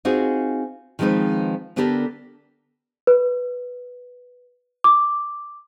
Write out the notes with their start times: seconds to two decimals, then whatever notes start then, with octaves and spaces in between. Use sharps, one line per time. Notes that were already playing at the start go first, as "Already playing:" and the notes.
0.05 C4 D#4 F4 F#4 G#4
0.99 D#3 F3 G#3 C4 D#4 B4
1.76 D3 B3 D4 G4 A4 A#4
3.07 B4
4.84 D6